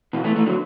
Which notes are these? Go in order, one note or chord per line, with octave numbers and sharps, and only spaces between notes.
B2 E3
E3 A3
E3 A3
D3 F#3